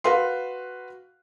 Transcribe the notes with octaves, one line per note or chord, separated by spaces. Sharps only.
F#4 B4 F5 C6